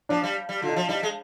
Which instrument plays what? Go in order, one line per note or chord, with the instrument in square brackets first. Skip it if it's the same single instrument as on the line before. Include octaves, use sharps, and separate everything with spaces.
[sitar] F3 [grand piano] D4
[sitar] G3
G3
[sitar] D3 [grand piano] F4
[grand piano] D#4
[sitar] F3 [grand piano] F4
[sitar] G3 [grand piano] D#4
[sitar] G#3